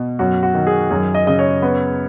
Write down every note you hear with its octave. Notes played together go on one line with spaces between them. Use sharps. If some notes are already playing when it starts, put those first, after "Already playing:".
Already playing: B2
F#2 F#4
F#4
D#3
G#4
F#2 G#4
D#5
C#3 D#5
C#5
B3